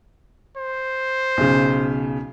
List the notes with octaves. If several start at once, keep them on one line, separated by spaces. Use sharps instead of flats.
C5
B1 C#3